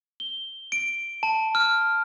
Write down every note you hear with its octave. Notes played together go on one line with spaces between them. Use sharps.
G7
D7
A5
F6